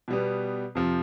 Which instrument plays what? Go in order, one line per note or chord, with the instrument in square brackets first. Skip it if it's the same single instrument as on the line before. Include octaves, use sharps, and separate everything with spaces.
[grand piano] B2 G3 B3
F2 C3 F3